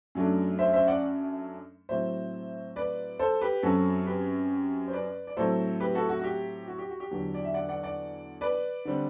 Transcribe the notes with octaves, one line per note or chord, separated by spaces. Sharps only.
F#2 F#3 A3 D4
C5 E5
C5 E5
D5 F#5
A2 F#3 C4 C5 E5
B4 D5
A4 C5
G4 B4
F#2 F#3 C4 F#4 A4
G4 B4
C5
B4 D5
D5
A2 F#3 C4 A4 C5
G4 B4
F#4 A4
F#4
F#4
G4
F#4
G4
F#4
G4
E2 D3 F#3
D5
E5
D5 F#5
D5 F#5
D5 F#5
B4 D5
D3 G3 C4